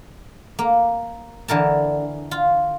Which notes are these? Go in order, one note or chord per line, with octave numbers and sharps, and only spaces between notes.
A#3
D3 E3 A#4 A5
F4